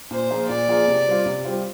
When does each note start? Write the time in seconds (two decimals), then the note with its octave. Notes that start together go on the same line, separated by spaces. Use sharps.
0.11 A#2 C5
0.30 F3 A#3 F4 G#4
0.48 A#2 D5
0.68 F3 A#3 F4 G#4
0.88 C3
1.07 G3 C4 F4
1.26 C3
1.45 G3 C4 F4